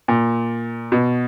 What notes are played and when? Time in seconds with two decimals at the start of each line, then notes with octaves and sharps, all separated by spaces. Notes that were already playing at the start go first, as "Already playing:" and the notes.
0.08 A#2
0.92 B2